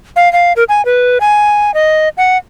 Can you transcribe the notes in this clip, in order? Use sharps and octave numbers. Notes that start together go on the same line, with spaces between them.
F5
F5
A#4
G#5
B4
G#5
D#5
F#5